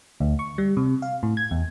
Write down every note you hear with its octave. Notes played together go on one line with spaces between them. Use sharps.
D2
C#6
G3
C3
F5
A2
G#6
E2